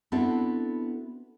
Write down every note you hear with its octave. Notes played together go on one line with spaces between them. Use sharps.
B3 C4 D4 E4 F#4 A4